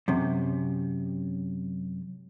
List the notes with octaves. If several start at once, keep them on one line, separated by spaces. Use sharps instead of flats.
F#2 C3